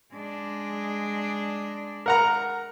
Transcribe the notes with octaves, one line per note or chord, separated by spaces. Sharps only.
G#3 D4
A#4 F#5 A#5